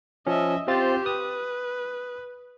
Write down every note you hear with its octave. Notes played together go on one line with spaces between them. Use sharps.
F3 C#4 D#5 E5
C4 F4 G4 C5 A6
B4 D#6